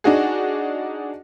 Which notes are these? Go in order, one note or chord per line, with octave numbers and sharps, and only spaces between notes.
D4 D#4 F#4 G#4